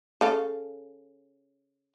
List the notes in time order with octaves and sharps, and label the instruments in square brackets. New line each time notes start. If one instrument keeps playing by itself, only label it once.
[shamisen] C#3 A4 F5